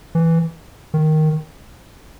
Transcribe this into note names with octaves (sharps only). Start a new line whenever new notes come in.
E3
D#3